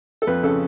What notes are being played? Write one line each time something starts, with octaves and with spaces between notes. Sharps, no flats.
A4
F2 B4
C#3 A4